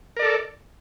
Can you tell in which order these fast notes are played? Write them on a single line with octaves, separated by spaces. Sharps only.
A#4 D5 A4